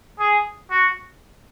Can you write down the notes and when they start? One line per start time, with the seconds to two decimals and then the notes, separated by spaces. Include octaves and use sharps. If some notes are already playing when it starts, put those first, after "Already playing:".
0.20 G#4
0.71 F#4